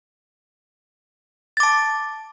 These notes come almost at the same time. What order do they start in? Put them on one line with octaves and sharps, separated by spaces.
A6 D6 A5